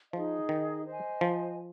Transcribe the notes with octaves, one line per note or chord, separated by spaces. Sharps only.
F3 D#4 G#4 D#5
D#3
C5 D#5 G#5
F3